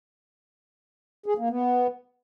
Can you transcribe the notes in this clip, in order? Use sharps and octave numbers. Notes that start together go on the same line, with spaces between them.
G#4
A#3
B3